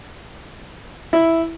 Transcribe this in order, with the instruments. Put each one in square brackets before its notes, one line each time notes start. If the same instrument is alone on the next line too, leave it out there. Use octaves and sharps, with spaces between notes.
[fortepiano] E4